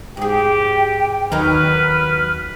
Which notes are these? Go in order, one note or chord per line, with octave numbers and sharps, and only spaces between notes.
G#2 G4 G#4 G5
D#2 F#3 D#4 A#4 B4 F6